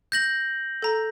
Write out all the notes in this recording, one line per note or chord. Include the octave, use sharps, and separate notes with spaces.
G6 A#6 F#7
A4 A#5